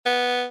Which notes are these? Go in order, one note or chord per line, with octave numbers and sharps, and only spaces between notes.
B3